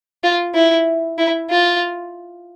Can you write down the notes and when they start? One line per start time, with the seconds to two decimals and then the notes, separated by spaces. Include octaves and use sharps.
0.24 F4
0.55 E4
1.18 E4
1.50 F4